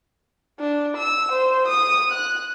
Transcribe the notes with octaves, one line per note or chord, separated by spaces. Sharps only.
D4
E6
C5
D#6
F#6